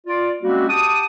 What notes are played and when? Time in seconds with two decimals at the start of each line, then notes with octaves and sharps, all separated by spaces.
0.07 F4 D5
0.43 G3 G#3 A#3 C4 C#4 F#4
0.69 G4 F#5 A5 D6 D#6